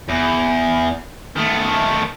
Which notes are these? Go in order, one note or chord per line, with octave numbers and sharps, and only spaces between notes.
E2
D#3 A3